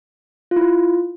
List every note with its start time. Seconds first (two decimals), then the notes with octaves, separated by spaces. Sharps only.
0.51 F4
0.56 E4
0.61 F4